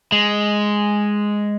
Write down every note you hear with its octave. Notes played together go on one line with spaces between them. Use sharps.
G#3